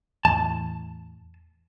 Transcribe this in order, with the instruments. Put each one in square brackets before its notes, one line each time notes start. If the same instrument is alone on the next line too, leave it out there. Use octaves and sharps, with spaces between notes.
[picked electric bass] E2 A2 E3 [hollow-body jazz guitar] A5